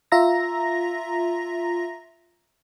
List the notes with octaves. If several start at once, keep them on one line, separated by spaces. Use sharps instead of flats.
F4 E5 A#5 A#6